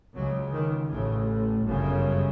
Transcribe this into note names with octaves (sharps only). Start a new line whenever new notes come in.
C#2 C#3 F#3
D#3
A1 A2 C#3
G1 F#2 C#3